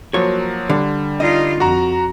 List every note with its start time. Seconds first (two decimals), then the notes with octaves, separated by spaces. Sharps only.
0.14 F3 F#3 A#3 C#5
0.70 D3 G3
1.20 D#4 F4 D#5
1.60 F2 F#4 A#5